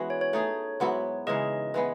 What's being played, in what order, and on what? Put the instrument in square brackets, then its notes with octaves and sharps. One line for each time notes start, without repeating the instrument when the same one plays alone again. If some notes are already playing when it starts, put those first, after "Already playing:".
Already playing: [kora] E3 G#3 B3 C#4 F#4
[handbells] C#5
C#5
[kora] A3 D#4 G#4
G#2 F#3 B3 E4
[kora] C#3 E3 G#3 D#4 [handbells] D#5
[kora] E3 G#3 B3